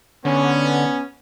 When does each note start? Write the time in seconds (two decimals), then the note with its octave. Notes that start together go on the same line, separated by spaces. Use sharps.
0.25 D3 B3 C#4